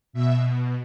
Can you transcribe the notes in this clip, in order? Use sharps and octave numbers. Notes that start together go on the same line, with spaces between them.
B2 E5